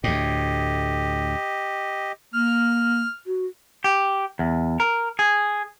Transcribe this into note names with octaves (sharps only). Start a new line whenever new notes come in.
D2 A2 G4 D#5
A#3 F6
F#4
G4
E2
A#4
G#4